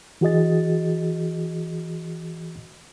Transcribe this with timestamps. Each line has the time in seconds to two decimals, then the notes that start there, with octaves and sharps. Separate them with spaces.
0.21 E3 F#4 G#4 D#5 A6